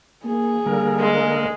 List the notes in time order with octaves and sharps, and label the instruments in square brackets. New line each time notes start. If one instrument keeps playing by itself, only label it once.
[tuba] A#3 [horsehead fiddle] G#4
[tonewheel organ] D3 A#3 A#4 [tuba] G3
[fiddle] G#3